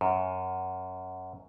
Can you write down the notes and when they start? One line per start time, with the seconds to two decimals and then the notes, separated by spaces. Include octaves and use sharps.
0.01 F#2